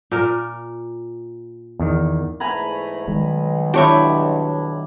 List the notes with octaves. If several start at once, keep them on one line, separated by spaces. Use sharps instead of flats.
A#2 A#4
E2 D#3
E2 G#2 A3 G#5 A#5 B5
B1 D#3 G3 G#3
D4 E4 G4 C#5 G#5